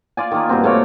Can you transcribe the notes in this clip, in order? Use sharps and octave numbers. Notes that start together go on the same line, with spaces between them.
F4 D5 G#5
D#3 A#3
G2 B2 C4
A3 A#3 C#5 D5